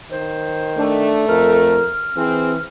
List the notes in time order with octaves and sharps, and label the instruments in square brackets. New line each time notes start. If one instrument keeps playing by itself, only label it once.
[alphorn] D#3 [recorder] C5
[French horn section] A3 [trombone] D4
[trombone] F2 [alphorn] A#4 [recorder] F6
[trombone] E3 [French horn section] C4 [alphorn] G#4